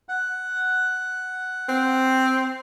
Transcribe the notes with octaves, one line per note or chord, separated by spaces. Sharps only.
F#5
C4